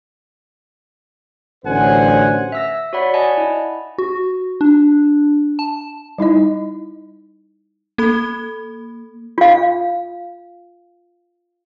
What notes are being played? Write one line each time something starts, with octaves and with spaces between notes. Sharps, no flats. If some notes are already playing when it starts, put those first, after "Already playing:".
A1 D3 F#3 C5 F#5 G#5
E5 E6 A#6
F#4 C#5 D5 F#5 B5
D5 D#5 F#5 G#5 A5
E4
F#4
D4
A5
G3 D#4 E4 D#5
A#3 A4 B5
F4 F5